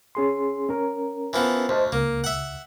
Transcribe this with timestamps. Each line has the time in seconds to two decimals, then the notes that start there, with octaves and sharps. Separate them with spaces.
0.15 C#4 G#4 C6
0.69 C#4 A#4
1.33 E3 F3 B3
1.69 D2 C5 D#5 A5
1.92 C#2 A#3
2.24 E5 F#5